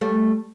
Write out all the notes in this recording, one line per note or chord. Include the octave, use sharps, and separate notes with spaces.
G3 A3